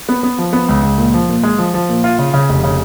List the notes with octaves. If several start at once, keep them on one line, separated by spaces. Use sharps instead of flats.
B3
B3
F3
B3
C#2
C#2
A#2
F3
A#2
G#3
F3
F3
A#2
F4
C#3
C#3
F1
C#3